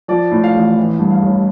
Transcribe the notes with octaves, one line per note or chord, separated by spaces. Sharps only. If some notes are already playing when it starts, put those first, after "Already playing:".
F3 D5
A2
F5
A1
E3
G2
F5
A1